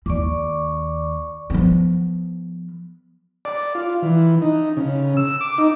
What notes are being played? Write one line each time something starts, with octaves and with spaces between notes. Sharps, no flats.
D#2 D5 C#6 D6
F3 B3
D5
F4
E3
D#4
C#3
E6
D6
D#4